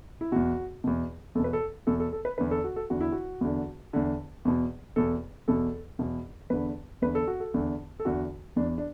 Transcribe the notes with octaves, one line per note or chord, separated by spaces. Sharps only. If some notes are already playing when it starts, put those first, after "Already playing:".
E4
E2 B2 F#4
E2 B2
E2 B2 A4 B4
A4
E2 B2 A4
A4
A4
B4
E2 D3 B4
A4
F#4
A4
E2 D3 F#4
E4
F#4
E2 D3
E2 D3
E2 B2
E2 B2 A4
E2 B2 A4
E2 B2
E2 D3 B4
E2 D3 B4
A4
F#4
A4
E2 D3
A4
E2 D3 F#4
E2 E3 D4
D4